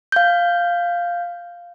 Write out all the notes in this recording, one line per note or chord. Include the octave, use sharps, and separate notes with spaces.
F5 G6